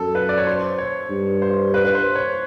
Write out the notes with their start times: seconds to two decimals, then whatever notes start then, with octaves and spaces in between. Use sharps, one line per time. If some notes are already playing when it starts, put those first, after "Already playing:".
Already playing: F#2 A4
0.15 B4
0.29 D5
0.38 C#5
0.47 C5
0.78 C#5
1.10 G2
1.42 C5
1.74 B4
1.85 B4
1.95 C5
2.16 C#5